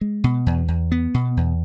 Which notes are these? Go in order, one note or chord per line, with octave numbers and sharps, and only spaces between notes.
G#3
B2
E2
E2
B3
B2
E2